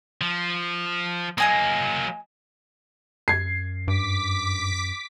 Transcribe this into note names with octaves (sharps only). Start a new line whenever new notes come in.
F3
F#3 A#3 D#5 G#5 D#6
F#2 G#6 C7
G2 D6 B6